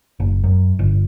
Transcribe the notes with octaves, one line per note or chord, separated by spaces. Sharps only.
F#1
F#2
G1